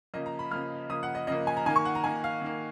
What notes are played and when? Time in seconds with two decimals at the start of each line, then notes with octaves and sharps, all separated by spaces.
0.14 C#3 F3 A#3 D#5
0.26 A#5
0.39 B5
0.51 C#3 F3 A#3 F6
0.89 C#3 F3 A#3 D#6
1.03 F#5
1.15 D#5
1.27 C#3 F3 A#3 D#5
1.47 G#5
1.57 A#5
1.66 D#3 A#3 G#5
1.76 C#6
1.85 F#5
1.95 A#5
2.04 D#3 A#3 G#5
2.24 F5
2.42 D#3 A#3